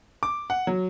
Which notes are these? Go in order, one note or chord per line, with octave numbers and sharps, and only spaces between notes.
D6
F#5
F#3